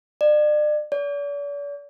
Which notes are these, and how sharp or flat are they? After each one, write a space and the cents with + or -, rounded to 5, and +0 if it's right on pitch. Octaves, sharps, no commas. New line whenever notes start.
D5 +35
D5 -45